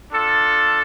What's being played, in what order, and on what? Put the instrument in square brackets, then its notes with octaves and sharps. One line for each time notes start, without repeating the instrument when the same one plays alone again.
[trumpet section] D4 F4 A4